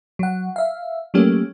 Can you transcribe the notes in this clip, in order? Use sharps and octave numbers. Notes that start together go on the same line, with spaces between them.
F#3 F#5
E5 F5
F#3 A3 A#3 C#4 G4